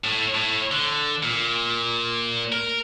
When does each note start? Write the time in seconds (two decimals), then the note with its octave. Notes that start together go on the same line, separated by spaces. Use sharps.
0.04 A2
0.35 A2
0.71 D3
1.23 A#2
2.52 A#4